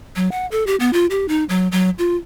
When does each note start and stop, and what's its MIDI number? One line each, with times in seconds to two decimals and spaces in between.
0.16 0.30 54
0.31 0.46 78
0.51 0.66 69
0.67 0.76 67
0.80 0.93 59
0.93 1.06 65
1.10 1.28 67
1.28 1.44 63
1.49 1.68 54
1.72 1.90 54
1.99 2.16 65